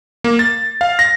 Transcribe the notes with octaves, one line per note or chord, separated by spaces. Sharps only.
A#3
A6
F5
A#6